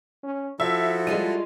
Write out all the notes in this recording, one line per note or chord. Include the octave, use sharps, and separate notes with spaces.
C#4
F3 E4 F#4 A4 E5
G3 G#3 F4 E5 D#7